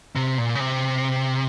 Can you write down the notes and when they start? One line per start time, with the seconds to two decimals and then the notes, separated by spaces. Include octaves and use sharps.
0.16 C3
0.38 A#2
0.55 C#3
0.60 C3